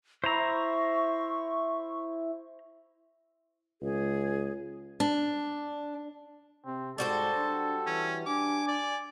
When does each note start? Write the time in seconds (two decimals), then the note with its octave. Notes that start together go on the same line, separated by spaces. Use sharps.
0.24 E4 C5 A#5 C#6
3.82 C#2 G#4
5.00 D4
6.66 C3 C4
6.98 G#2 G3 F#4 A4 C5 A5
7.35 D4
7.87 E3 C#4
8.26 D4 G#5 D6
8.68 D5